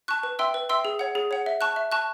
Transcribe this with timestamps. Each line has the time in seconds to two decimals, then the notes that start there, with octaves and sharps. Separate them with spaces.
0.08 A5 C#6 F#6
0.23 B4
0.39 E5 G5 C6 E6
0.54 B4
0.69 E5 G5 C6 E6
0.85 G#4
0.99 C#5 F#5
1.15 G#4
1.31 C#5 F#5
1.46 E5
1.61 A5 C#6 F#6
1.76 E5
1.92 A5 C#6 F#6